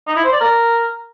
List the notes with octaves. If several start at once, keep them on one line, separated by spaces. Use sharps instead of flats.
D#4
E4
C5
D5
A#4